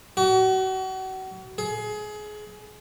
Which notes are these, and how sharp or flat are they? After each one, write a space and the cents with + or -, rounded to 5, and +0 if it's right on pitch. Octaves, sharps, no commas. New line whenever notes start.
F#4 +35
G#4 +25